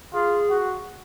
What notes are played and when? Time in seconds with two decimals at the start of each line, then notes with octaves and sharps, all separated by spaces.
0.13 F4 G#4
0.50 F#4